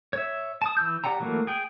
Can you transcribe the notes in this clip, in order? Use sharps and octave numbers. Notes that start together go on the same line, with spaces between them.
C#5 E5
A5 D#6
E3 E6 G6
G4 D5 F#5 G5 A#5
E3 F#3 A3 A#3 F#4
G#4 G5